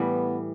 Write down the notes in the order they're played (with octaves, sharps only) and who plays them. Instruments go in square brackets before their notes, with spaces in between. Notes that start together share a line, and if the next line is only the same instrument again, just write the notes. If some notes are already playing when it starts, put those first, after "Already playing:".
Already playing: [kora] A2 E3 G3 [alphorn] B3